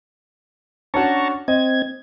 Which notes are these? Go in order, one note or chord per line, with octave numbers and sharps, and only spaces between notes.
C#4 D4 F#4 A5 A#5 C#6
C4 D#5 G#6